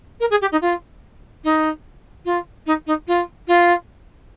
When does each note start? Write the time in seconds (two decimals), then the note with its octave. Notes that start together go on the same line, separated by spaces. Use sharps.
0.20 A#4
0.30 G#4
0.41 G4
0.51 D#4
0.61 F4
1.44 D#4
2.25 F4
2.66 D#4
2.86 D#4
3.07 F4
3.47 F4